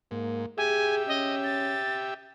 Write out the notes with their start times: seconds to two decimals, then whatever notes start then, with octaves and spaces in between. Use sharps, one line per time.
0.11 G#2 A#3
0.58 G4 G#4 E5 G#5
1.08 C#4 D#5
1.43 A6